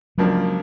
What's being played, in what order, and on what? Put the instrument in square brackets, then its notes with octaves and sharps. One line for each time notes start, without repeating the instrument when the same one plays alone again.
[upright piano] C#2 C#3 F3 A#3 D4 [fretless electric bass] F#3